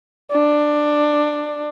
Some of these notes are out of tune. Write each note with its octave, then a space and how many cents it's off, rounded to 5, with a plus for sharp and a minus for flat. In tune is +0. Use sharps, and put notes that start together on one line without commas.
D4 +15